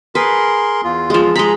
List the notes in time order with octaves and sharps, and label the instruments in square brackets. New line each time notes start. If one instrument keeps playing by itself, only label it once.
[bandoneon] G#4 A#4 C6 [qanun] B4
[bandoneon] E2 F4
[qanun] F3 G#3
[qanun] G#3 B5 [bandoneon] G#4 A#5